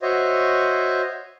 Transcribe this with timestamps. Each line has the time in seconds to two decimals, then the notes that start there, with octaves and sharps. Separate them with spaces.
0.02 F#4 C5 C#5 D#5 E5